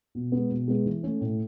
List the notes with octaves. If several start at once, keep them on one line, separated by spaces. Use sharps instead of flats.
B2
G#3 B3
B2
G#3 B3
E3
A3 C#4
A2